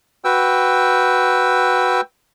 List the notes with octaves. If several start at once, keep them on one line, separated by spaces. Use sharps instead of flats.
F#4 B4 G5 E6